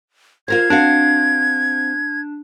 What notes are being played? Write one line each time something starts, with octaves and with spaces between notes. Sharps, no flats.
F4 A#4 C5 G#6
C4 D4 F#4 F5